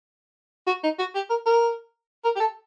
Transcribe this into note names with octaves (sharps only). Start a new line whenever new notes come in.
F#4
D#4
F#4
G4
A#4
A#4
A#4
G4
A4